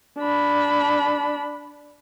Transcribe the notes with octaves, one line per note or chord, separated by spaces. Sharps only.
D4 B5